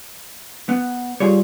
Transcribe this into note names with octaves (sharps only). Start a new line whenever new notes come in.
B3
G3 F4 G#4 C#5